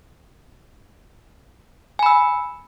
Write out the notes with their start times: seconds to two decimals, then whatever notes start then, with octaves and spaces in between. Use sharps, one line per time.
1.99 G#5
2.03 B5
2.06 E6